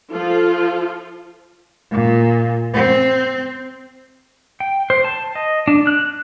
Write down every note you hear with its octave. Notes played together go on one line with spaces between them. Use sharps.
F3 F4 A4
A#2
C4
G5
C5
A5
D#5
D4
F#6